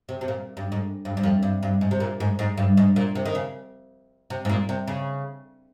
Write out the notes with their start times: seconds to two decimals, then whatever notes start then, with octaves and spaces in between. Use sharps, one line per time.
0.09 C3
0.21 C3
0.28 A#2
0.57 G2
0.72 G#2
1.05 G2
1.17 G2
1.23 F2
1.43 G2
1.63 G2
1.81 G#2
1.91 C3
2.00 A#2
2.20 G#2
2.39 G#2
2.57 G2
2.77 G#2
2.96 A#2
3.15 C3
3.25 D#3
3.35 C#3
4.30 C3
4.45 G#2
4.49 A#2
4.69 C3
4.88 C#3